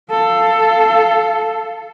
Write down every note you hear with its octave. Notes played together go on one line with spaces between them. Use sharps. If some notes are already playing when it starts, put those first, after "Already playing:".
A4 F5